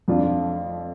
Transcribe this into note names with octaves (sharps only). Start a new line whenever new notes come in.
F2 F3 D4 F4